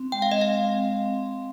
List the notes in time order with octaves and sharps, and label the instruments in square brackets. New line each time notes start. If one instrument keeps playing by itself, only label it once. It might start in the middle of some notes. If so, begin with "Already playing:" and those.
Already playing: [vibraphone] C4
[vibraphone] G#3 [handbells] G5
[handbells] F5
D#5
[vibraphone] C4 [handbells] F5
[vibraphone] C4
C4